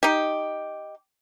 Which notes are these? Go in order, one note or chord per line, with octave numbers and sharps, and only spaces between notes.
D#4 G4